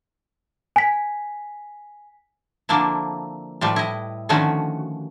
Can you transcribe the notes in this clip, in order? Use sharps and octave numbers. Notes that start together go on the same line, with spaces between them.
G#5 B6
D3 F3 A#3 C4 D4 E4
A2 F3 G3 B4
E4 D#5
D3 D#3 F3 A3 C#4 F#4